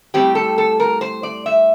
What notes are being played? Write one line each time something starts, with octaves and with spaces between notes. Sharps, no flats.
A2 G3 C4 G4
A4
A4
A#4
C5
D5
E5